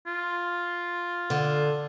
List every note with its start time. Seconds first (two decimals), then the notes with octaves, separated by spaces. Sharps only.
0.07 F4
1.30 D3